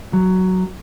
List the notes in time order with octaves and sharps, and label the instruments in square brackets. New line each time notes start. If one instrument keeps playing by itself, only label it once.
[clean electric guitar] F#3